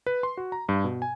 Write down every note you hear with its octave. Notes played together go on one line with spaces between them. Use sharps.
B4
C6
F#4
A#5
G2
B2
G#5